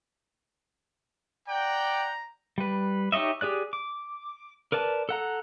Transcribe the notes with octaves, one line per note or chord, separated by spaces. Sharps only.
D5 F#5 G5 A#5
G3 B4
D#4 G4 C#5 D#5 E5
G4 G#4 D5 F#6
D6
A#4 B4 D5 A5
A4 F#5 A#5